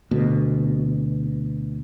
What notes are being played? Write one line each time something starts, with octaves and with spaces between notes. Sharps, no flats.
D2 B2